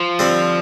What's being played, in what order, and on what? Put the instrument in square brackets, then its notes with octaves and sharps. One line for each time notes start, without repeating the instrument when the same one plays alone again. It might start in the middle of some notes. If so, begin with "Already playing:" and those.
Already playing: [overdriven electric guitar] F3
[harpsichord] D3 G3 C4